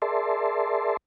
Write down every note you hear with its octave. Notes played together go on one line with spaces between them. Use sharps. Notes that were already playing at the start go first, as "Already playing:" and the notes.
G#4 A#4 D5 E5 A5 C6